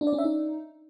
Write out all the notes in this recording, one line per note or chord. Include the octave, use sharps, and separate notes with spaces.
D4
D5
C#4
E5
D#4